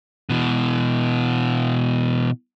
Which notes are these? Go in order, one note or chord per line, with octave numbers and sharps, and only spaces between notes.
B2 E3